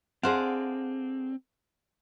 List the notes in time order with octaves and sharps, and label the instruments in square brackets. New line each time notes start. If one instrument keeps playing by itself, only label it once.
[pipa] D3 C5 F#5 [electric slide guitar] C4 [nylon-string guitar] G#4 D5 F5